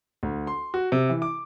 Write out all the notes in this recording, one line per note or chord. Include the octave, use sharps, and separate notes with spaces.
D2
C6
F#4
C3
E3
D6